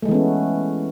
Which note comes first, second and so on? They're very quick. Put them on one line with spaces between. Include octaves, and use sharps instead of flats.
A3 G#3 E3 B3 C#4